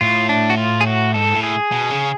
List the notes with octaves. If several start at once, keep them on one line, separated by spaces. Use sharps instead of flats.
A2 F4
D4
F#4
F4
G#4
F#4
G#2 A4
A2
G#4
B2
C#3